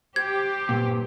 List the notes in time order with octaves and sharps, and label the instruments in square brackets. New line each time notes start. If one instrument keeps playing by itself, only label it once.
[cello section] G4 [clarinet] C5 [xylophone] G#6
[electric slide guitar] G2 A#2